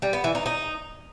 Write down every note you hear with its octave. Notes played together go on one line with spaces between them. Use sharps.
G3
B3
E3
D#4
D#4